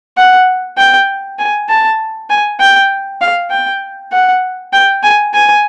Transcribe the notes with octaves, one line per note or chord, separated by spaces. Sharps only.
F#5
G5
G#5
A5
G#5
G5
F5
G5
F#5
G5
G#5
G#5